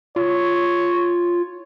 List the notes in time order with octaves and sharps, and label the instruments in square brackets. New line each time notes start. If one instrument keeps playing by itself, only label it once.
[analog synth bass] F4 [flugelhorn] C#5